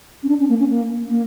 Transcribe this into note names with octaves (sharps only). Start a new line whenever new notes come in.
C#4
D4
C#4
A#3
C#4
A#3
A#3